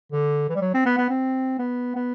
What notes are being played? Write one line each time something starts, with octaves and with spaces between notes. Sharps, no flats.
D3
E3
G3
F#3
C4
B3
B3
C4
B3
B3